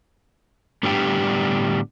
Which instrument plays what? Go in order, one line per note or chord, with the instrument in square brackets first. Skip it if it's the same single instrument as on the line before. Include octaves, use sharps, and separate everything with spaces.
[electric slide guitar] A2 D3 G3 B3 D4 G4